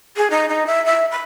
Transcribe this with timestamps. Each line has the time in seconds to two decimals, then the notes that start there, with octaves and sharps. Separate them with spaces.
0.16 G#4
0.30 D#4
0.48 D#4
0.66 E5
0.85 E5
1.11 B5